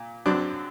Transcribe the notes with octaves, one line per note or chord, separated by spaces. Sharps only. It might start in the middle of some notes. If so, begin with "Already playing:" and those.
Already playing: A#2
F#2 F#3 C4 D4